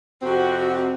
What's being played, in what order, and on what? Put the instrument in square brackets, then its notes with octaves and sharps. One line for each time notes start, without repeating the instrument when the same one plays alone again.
[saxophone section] F2 C3 C4 [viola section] F#4